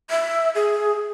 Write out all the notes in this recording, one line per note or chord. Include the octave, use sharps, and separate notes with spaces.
E5
G#4